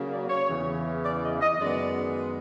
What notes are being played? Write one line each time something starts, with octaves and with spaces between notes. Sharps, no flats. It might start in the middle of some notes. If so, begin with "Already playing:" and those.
Already playing: C#3 F#3 A#3
D5
C#5
E2 C#3 E3
D5
D#5
D#5
F#2 D#3 G#3 B3 D5